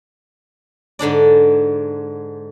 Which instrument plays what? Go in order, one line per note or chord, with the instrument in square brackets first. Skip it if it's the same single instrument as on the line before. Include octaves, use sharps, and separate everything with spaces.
[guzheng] G#2 D3 D4 D5